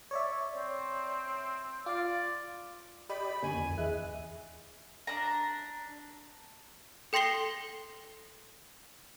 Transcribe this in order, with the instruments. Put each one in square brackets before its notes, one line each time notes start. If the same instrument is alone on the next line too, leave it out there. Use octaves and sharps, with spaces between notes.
[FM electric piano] C#5 D5 E5
[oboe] C4
[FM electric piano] F4 F5 [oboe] D5
[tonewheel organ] G4 D5 D#5 [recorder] B5
[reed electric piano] F#2 [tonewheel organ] D3 A#3 C#4 [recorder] G#5
[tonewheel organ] F2
[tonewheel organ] D#2 E3 F#6 [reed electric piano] G#4 D#5 E5
[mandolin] D4 A#5
[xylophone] A4 G5 C6 A#6 C7 G7